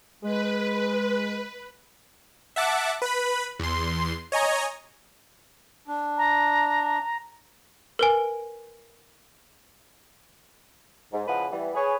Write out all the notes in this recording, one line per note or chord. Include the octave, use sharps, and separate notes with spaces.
G#3 B4
E5 F#5 A5 D6
B4 B5
E2 C6
C#5 D#5 G#5 A#5
D4
A#5
A#4 B4 G#5
G#2
C#3 F3 E4 B4 D#5 F#5
E3 G3 B3
G#4 B4 C#5